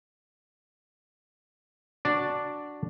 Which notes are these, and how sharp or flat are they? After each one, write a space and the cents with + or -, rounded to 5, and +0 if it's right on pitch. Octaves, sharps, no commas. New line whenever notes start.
D4 +0 F#4 +0 D5 +0